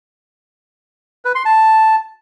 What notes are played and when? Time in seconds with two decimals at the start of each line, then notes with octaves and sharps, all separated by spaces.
1.25 B4
1.35 C6
1.45 A5